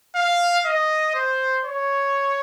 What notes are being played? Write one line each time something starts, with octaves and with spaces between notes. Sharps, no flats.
F5
D#5
C5
C#5